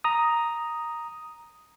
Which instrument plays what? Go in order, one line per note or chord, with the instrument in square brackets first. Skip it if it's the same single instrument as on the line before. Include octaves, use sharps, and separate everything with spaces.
[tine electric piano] A#5 D#6